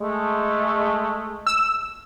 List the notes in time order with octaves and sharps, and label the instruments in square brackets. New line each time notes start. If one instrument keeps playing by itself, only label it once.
[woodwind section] G#3 A3
[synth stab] E6